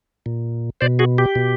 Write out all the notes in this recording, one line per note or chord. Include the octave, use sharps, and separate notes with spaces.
A#2
B2 C5 D5
F#4 G#4
G4
B2